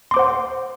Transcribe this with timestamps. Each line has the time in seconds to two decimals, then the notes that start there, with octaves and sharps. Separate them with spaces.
0.11 C6
0.14 D6
0.17 C5
0.19 F#5